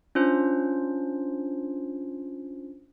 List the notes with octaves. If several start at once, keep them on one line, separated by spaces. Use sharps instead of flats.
C#4 D4 F4 C5